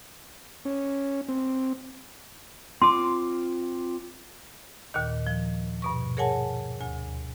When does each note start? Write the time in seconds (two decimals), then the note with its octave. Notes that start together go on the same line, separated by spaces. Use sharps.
0.65 C#4
1.28 C4
2.82 C4 F4 C6 D6
4.94 D#2 A#2 D#3
5.27 F3
5.82 G2 B2 C#6
6.17 G#4 A#4 C#5 F#5 G#5 A5
6.80 D2 G#5